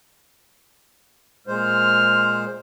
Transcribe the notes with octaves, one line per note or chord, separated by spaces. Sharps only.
A#2 G#3 C5 F6